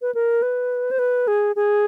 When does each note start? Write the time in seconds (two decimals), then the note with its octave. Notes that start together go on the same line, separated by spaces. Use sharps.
0.02 B4
0.15 A#4
0.42 B4
0.91 C5
0.99 B4
1.28 G#4
1.56 G#4